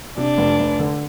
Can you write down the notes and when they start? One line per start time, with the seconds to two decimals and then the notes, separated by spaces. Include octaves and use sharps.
0.17 C3 D4
0.38 F1
0.59 F1
0.79 D3